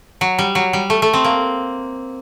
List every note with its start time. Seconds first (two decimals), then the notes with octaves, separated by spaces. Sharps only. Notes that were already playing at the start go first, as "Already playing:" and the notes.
0.21 F#3
0.39 G3
0.55 F#3
0.73 G3
0.90 A3
1.02 A3
1.13 C4
1.24 A#3